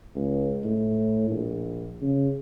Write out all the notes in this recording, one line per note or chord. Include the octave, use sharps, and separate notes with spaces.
C#2
A2
A#1
C#3